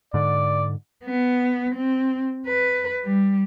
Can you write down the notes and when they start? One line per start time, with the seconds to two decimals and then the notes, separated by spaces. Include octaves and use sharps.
0.14 G#2 D3 D5
1.04 B3
1.75 C4
2.47 B4
3.04 G3